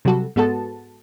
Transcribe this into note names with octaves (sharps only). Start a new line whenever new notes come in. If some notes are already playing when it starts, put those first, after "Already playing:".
C3 F#3 G3 F#4 A4
G#2 G#3 B3 F#4 A4 A5